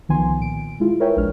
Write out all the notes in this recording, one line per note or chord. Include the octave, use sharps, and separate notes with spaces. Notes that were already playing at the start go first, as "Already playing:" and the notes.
C2 D#3 F3 B3 G#5 C6
A#2 D7
G#3 E4 F4
A#4 B4 C#5 E5 G5 G#5
A#1 G#3 D4 C#5 F6